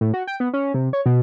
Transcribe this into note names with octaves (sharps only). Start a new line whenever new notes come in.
A2
F#4
G5
B3
C#4
C3
C#5
B2